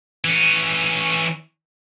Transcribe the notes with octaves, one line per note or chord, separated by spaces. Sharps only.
E3 C#4